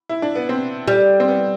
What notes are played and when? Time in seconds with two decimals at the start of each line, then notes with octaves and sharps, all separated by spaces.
0.09 E4
0.22 D4
0.35 B3
0.49 C4
0.88 G3
1.20 C4
1.28 B3